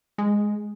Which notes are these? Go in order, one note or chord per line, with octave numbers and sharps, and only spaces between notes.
G#3